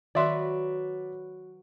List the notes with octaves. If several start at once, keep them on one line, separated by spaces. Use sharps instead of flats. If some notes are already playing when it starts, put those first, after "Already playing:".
D#3 F#3 F#4 B4 D5 E5 C6